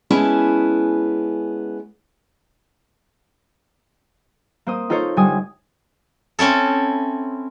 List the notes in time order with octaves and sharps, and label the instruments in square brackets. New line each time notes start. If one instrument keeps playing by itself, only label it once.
[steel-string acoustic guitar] G#3 B3 C#4 E4 G#4 A5
[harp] A#3 C5 D#6
D#4 F4 A4 C5 C#5
G1 G3 G#5 D#6
[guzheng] C4 C#4 E4 A4